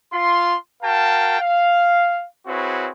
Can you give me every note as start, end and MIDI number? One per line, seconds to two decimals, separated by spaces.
0.13 0.56 65
0.13 0.56 84
0.83 1.37 66
0.83 1.37 70
0.83 1.37 77
0.83 1.37 79
0.83 1.37 81
1.40 2.25 77
2.47 2.90 60
2.47 2.90 64
2.47 2.90 66
2.47 2.90 68
2.47 2.90 71
2.47 2.90 73